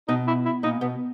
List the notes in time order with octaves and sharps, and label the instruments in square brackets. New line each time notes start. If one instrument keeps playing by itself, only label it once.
[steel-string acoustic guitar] B2 [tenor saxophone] D#4
[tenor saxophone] E4
E4
[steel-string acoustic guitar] A#2 [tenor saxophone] D#4
[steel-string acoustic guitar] B2 [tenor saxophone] B3